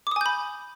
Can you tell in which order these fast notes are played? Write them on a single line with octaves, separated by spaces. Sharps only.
D6 D#6 G#5 G6 B5